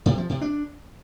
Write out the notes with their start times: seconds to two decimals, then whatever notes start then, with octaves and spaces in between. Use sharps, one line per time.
0.06 C3
0.18 F3
0.30 C3
0.41 D4